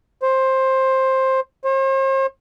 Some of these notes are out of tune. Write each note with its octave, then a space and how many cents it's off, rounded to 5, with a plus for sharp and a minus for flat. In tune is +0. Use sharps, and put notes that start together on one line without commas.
C5 +15
C5 +45